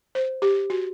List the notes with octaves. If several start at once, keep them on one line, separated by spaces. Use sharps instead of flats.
C5
G4
F#4